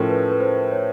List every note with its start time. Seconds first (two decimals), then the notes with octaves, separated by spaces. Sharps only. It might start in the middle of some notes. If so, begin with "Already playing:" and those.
Already playing: A2 F3 A3 C#4 A#4
0.09 B4
0.31 B4
0.40 C5
0.72 C#5